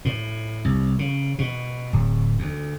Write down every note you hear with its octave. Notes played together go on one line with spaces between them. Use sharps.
A2
C2
C#3
B2
D1
D2